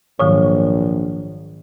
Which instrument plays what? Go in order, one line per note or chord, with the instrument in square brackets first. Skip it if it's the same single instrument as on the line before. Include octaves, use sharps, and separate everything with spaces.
[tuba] A#1 [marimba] G#2 D#3 F#3 [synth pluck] C#5